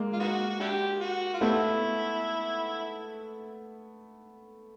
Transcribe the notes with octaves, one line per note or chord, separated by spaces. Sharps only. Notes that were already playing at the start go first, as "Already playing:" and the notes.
Already playing: G#3 A#3
F4
B3 D#4 F#4
F#4
D4 E4 G4
F#4
F4
G3 A3 B3 C4 E4